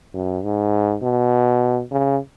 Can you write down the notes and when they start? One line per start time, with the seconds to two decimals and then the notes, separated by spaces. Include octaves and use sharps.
0.14 F#2
0.44 G#2
1.02 B2
1.91 C#3